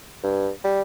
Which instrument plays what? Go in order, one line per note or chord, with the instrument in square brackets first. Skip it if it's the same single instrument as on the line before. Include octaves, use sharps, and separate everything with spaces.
[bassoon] G2
G3